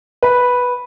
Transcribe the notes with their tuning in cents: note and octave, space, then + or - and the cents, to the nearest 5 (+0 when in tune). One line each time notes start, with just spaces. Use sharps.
B4 -5